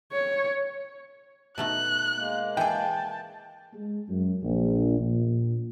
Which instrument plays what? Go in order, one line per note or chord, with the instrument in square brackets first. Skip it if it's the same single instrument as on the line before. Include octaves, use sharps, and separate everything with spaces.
[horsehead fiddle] C#5
[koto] B2 A3 D#4 [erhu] F#6
[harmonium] G#3 A#3
[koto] E3 G#4 [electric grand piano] G5 [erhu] A5
[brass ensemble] G#3
F#2
A#1
A#2